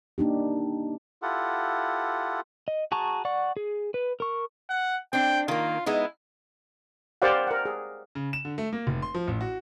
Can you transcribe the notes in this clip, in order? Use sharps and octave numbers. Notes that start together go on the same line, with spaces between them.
A#3 D4 D#4 G4
E4 F4 G4 A4 F#5
D#5
F#4 G#4 A5 A#5 C#6
D5 F#5 C#6
G#4
B4
A#4 C#6
F#5
C4 D4 G5
D#3 A#3 F4
G#3 B3 D#4 E4
G4 A#4 C5 D5 F5 F#5
A#4 F#5
G#4
C#3
E7
D3
A3
A#3
F1
C6
F3
A1
F#4